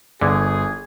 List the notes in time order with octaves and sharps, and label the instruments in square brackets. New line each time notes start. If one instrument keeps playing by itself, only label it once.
[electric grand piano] G1 [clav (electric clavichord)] D3 [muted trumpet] G#4